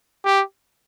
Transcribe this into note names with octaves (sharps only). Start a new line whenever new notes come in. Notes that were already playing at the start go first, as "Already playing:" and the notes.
G4